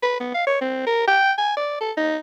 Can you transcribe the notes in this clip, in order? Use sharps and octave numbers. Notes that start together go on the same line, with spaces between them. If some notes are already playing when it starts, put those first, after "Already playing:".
B4
B3
F5
C#5
C4
A#4
G5
G#5
D5
A4
D#4